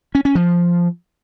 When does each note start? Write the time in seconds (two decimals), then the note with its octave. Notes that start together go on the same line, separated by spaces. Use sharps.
0.15 C#4
0.25 C#4
0.35 F3